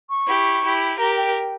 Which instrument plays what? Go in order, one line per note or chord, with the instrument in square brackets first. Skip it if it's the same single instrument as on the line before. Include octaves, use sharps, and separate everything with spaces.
[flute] C#6
[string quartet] E4 G4
E4 G4
[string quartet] G4 A#4 [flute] A#5
[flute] G5